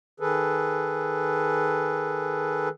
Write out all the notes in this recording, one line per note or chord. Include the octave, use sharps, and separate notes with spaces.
D#3 G#4 A4 B4